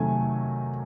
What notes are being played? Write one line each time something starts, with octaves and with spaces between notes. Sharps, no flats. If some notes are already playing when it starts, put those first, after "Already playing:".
Already playing: C3 D#3 F#3 A3 G#5